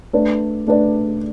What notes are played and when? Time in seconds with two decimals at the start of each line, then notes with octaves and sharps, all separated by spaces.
0.13 A3 D4 B4 D5
0.67 A3 D4 B4 D5